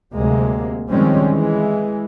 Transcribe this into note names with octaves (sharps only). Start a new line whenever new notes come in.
D2 C3 F#3 G#3 A#3
D#3 F3 G3 G#3 C4 C#4
E3 G#3